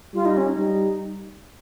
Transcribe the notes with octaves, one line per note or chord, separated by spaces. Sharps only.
G3 F4
D#4
C#4
D#4
G3